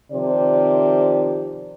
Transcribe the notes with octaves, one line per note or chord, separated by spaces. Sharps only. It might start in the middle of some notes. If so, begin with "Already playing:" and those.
C3 D#3 F3 D5